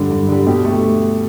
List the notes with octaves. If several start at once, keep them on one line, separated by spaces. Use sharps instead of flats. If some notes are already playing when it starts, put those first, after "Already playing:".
Already playing: G2 D3 G3
G2
D3 G3
B2 G4
A3
G4